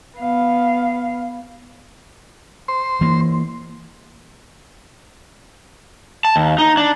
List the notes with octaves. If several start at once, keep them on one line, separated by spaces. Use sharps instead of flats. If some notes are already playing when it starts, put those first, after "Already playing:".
B3 F5
C5 C6
E3 A#3
A5
D#2
D#4
D4